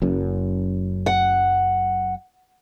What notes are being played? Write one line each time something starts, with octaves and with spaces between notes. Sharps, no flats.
F#1 F#2
F#5